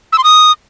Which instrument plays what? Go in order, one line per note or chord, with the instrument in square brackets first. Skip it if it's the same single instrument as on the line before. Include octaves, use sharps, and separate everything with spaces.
[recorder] E6
C6
D#6